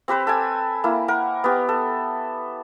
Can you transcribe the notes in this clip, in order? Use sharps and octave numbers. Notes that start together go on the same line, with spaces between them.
C4 G4 B4 C5
A4 G5 G#5
A#3 E4
A#4 F#5
B3 G4
A4